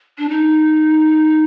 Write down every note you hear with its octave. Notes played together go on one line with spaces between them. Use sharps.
D4
D#4